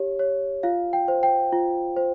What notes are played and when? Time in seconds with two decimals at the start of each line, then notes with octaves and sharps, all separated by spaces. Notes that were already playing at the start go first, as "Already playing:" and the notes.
Already playing: G4 C#5
0.19 C#5
0.63 F4 F5
0.93 G5
1.08 C5
1.23 G5
1.53 F4
1.96 C5